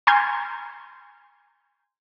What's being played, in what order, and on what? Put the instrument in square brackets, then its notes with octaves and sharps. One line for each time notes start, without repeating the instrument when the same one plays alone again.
[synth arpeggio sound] G#5 A#5 C6 F6 G6 G#6